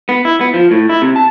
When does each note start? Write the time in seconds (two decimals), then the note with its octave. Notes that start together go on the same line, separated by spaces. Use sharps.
0.09 B3
0.25 E4
0.41 B3
0.54 F3
0.71 A2
0.89 E4
1.02 C3
1.16 A5